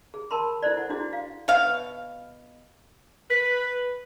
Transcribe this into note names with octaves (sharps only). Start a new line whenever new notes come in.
G#4
A#4 A5 B5 C6
E4 A4 C5 D5
F#5
D4 E4 F#4 G#4
F5
B2 F5
B4 B6